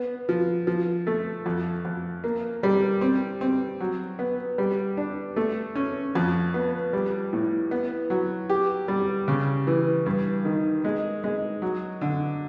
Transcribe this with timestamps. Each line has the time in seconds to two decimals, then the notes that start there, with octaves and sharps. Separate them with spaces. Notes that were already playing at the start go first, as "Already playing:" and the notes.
Already playing: B3
0.29 F3
0.67 F3
1.07 A3
1.46 F2
1.85 F2
2.24 A#3
2.63 G3
3.01 C4
3.41 C4
3.80 F#3
4.19 B3
4.58 G3
4.97 D4
5.36 A3
5.75 C#4
6.15 F2
6.54 B3
6.93 G3
7.33 A2
7.71 B3
8.10 F#3
8.50 G4
8.88 G3
9.28 C#3
9.67 E3
10.06 G2
10.45 D#3
10.84 G#3
11.24 G#3
11.62 F#3
12.01 D3